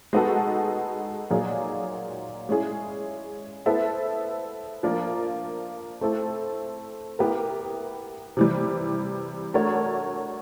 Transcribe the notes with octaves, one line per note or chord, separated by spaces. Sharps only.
G#3 B3 D#4 F#4 A4
A#2 F#3 A#3 D#4 G#4
G#3 C#4 E4 G#4
B3 E4 A4 C5 E5
F3 A#3 D4 F4 A#4
A3 C4 E4 A4
B3 E4 G4 A#4
C3 E3 G3
A3 D4 F#4 A#4 C#5